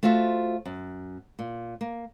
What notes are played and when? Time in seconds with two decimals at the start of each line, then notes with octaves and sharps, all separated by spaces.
0.03 A3 F4 F#4 C5 E5
0.65 F#2
1.39 A#2
1.81 A#3